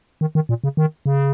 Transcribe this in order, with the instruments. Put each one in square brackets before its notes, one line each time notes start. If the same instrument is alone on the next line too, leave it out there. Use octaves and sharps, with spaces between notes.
[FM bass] D#3
D#3
A#2
C#3
D#3
C#3